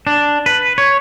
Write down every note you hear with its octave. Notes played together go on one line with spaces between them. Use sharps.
D4
B4
C#5